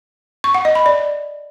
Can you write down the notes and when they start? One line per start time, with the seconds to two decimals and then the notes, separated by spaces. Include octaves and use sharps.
0.44 C#6
0.55 F#5
0.65 D#5
0.75 B5
0.86 D5